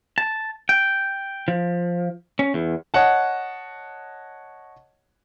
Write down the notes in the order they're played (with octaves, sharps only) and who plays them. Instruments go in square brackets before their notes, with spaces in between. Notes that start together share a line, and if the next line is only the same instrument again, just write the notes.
[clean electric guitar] A5
G5
F3
C#4
E2
[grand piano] C#5 D#5 F#5 A5